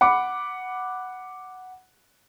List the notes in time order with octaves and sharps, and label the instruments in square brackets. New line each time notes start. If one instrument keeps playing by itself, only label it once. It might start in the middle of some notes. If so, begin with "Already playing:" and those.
[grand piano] F#5 B5 D6